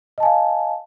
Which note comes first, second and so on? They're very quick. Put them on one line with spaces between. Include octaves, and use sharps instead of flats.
D#5 A5 G#5 F5